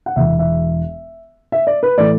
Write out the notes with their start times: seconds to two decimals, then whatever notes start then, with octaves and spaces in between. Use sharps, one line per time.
0.06 F#5
0.16 E1 E2 E3 E5
0.39 E5
1.52 E5
1.67 D5
1.83 B4
1.98 A2 E3 A3 D5